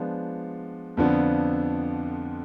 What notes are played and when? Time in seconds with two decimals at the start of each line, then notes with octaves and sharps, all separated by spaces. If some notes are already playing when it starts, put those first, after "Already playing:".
Already playing: F3 G#3 B3 D4
0.97 F2 D3 F3 B3 D4